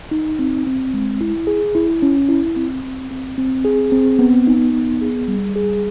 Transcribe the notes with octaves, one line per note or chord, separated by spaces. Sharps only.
D#4
C4
C4
G#3
E4
G#4
E4
C#4
E4
C4
C4
C4
C4
G#4
C4
B3
D#4
B3
G#4
G3
G#4